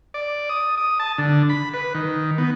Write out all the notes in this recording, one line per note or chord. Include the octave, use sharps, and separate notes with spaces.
D5
D#6
D#6
A5
D3
B5
B4
D#3
B3